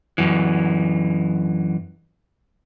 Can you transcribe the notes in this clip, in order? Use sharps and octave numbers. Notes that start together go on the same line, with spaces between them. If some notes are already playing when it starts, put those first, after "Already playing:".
F#2 E3